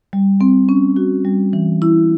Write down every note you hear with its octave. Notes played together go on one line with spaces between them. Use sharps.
G3
C4
C#4
F#4
G3
E3
E4